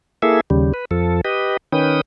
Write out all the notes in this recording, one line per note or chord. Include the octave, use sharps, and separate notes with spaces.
A#3 E4 G#4 A4 E5
D#2 C#3 G3
B4
F2 F3 A4
G4 B4 D#5
D#3 C#4 B4 G5 D#6